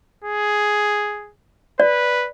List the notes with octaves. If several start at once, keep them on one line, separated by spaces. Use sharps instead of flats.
G#4
B4 D5